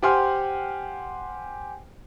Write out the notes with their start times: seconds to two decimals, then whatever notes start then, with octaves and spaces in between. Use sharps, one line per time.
0.02 G4 C5 F#5 G#5 C6 F6